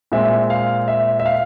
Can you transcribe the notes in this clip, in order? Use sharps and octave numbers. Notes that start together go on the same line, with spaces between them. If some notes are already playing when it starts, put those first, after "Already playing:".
A#2 G#3 C4 E5
F5
E5
E5
F5